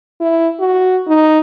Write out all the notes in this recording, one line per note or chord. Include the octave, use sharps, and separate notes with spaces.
E4
F#4
D#4